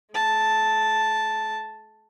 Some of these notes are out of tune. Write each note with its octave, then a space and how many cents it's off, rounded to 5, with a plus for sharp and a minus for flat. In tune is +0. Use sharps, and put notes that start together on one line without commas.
G#3 +45 A5 +0